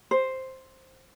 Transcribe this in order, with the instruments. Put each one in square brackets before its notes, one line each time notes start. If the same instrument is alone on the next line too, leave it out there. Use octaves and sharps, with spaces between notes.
[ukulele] C5